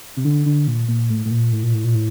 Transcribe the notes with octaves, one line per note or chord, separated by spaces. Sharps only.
C3
D3
D3
A#2
A#2
A2
A2
A#2
A2
A#2
A2
A#2
A2